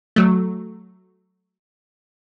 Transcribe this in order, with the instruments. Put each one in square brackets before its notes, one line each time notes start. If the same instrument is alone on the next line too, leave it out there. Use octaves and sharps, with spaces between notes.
[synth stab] F#3 A3